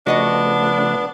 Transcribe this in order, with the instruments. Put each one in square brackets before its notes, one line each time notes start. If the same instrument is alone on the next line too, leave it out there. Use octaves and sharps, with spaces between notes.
[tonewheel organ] C#3 F3 A3 [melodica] B3 [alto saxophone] D4 [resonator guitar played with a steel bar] F#4 D#5 F#5